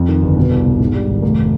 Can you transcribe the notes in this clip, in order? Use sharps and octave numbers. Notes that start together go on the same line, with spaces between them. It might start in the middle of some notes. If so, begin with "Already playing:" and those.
Already playing: F2
D#3
G1
B2
C2
B2
G#2
G3
G#1
F1